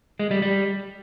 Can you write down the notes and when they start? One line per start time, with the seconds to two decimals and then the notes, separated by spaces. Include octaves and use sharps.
0.19 G#3
0.31 G3
0.42 G3